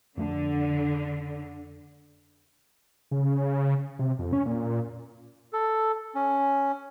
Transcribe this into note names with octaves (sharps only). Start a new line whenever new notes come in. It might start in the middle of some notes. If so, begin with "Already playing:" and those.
F2 D3 A3 D4
C#3
C3
F2
C#4
A#2
A4
C#4